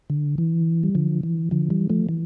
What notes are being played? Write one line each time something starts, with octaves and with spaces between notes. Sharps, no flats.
D3
E3
G3
D3 F3
E3
D3 F3
E3 G3
F3 A3
E3